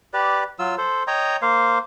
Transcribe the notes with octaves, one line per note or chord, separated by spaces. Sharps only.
G4 B4 D5
F#3 F4 E6
A4 C5
C#5 D#5 G5 A#5
A#3 C5 F5